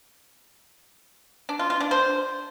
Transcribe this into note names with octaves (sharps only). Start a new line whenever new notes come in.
D4
F4
F4
D4
C5